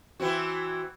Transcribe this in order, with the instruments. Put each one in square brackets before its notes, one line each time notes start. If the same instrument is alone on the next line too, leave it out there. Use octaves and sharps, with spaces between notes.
[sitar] E3 C4 F#4